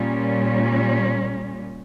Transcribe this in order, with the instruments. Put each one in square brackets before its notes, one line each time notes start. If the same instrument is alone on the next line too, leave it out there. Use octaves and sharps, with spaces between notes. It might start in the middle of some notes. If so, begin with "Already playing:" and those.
Already playing: [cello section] A#2 G3 C#4